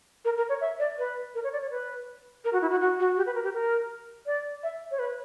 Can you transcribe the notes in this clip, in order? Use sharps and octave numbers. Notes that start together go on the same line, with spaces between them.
A#4
A#4
C#5
E5
D5
B4
A#4
C#5
D5
C#5
B4
A#4
F#4
E4
F#4
F#4
F#4
G4
B4
A#4
G4
A#4
D5
E5
C#5
B4